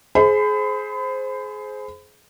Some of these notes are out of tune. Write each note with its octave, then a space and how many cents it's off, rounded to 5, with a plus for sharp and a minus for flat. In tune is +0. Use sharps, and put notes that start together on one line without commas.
G#4 +25 C5 +0 B5 +35